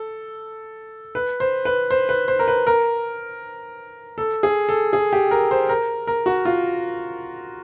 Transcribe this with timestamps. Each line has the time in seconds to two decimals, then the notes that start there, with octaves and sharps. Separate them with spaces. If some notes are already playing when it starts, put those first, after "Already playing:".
Already playing: A4
1.15 B4
1.40 C5
1.65 B4
1.91 C5
2.09 B4
2.28 C5
2.39 A#4
2.48 B4
2.67 A#4
4.18 A4
4.43 G#4
4.69 A4
4.93 G#4
5.13 G4
5.31 A#4
5.51 C5
5.69 A#4
6.07 A#4
6.26 F#4
6.45 F4